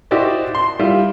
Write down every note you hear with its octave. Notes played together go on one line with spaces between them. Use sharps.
E4 F#4 G4 C5 D5 D#5
C6
G3 E4 F4